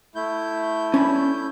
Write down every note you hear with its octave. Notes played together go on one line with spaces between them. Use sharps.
A3 E4 G6
C#4 D4 B5